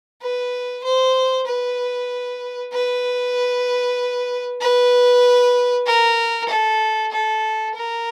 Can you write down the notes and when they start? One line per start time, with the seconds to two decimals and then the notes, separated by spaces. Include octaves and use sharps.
0.22 B4
0.84 C5
1.47 B4
2.73 B4
4.61 B4
5.86 A#4
6.49 A4
7.11 A4
7.74 A#4